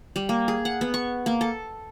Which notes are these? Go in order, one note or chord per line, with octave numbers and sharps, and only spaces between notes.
G3
A#3
G#4
F#5
B3
C#6
A#3
A4